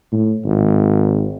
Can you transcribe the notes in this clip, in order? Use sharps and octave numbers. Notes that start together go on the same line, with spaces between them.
A2
G#1